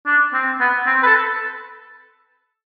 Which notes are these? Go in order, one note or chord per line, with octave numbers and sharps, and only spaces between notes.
D4
C4
B3
C4
B4
A4